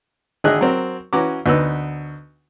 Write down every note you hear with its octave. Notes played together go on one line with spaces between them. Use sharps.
G#1 D3 G#4 D#5 E5 F#6
F#3 C4 A#4
E3 C#4 F#4 A#5 D6
D2 B3 D#4 B4 E6